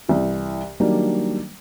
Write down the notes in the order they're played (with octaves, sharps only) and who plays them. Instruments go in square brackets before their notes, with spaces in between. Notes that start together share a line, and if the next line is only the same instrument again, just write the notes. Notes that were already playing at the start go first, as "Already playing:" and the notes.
[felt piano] C2 E3
D#3 F#3 G3 A#3 D4